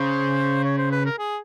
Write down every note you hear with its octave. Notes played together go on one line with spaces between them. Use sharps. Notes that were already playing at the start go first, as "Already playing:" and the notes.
Already playing: C#3 C5
C#5
C5
B4
A#4
G#4